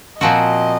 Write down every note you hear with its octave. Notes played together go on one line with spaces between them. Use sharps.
A#2 F3 C4 F#4 D#5